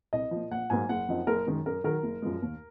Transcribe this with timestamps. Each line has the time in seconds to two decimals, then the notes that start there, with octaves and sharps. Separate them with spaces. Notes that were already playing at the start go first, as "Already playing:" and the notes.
0.13 C2 D#5
0.31 A#2 F3
0.51 A#1 F#5
0.70 G#2 F#3 A#3 G#5
0.89 F#1 F#5
1.08 F#2 F3 C4 D#4
1.27 F#1 A#4
1.47 F#2 D#3 G#3
1.66 F#2 A#4
1.84 D#3 F#3 A#4
2.03 F#1
2.22 F#2 F3 G#3
2.42 D#2